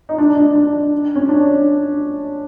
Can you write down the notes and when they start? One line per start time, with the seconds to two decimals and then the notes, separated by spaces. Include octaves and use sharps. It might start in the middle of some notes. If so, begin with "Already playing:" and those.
0.09 D#4
0.18 D4
0.37 D4
0.55 D4
1.15 C#4
1.29 D4